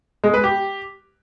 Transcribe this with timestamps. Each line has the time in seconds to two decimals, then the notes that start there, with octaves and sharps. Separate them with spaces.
0.24 G#3
0.34 B4
0.44 G4